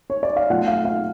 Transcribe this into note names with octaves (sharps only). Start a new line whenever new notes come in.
C#5
D5
F5
B2 F#3 A3 F4 F#5
F5
F5